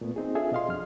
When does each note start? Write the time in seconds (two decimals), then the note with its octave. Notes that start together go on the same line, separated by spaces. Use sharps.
0.01 A#2 A3 B3
0.16 C4 D#4 G#4
0.35 D4 F4 G#4 A4 E5
0.52 B2 D#5 F5 C6
0.69 F2 F6